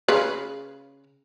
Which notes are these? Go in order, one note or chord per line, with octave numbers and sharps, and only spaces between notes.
C#3 G#4 B4